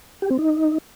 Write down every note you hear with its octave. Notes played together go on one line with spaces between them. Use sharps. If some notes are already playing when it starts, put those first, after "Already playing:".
G4
C4
D#4